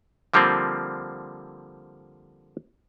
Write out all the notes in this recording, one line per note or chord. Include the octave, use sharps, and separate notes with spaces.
D3 F3 G3 A#3 C4